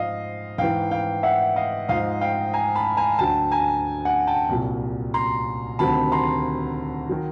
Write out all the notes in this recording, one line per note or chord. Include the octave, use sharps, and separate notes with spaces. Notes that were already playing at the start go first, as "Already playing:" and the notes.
Already playing: G#2 F3 D#5 F5
G#2 E3 F5 G5
F5 G5
E5 F#5
D#5 F5
G#2 F3 D#5 F5
F5 G5
G#5 A#5
A5 B5
G#5 A#5
D2 D3 F#3 G5 A5
G#5 A#5
F#5 G#5
G5 A5
C2 A#2 F#3
A#5 C6
D2 C3 D#3 F#3 A5 B5
A#5 C6
D#3 F#3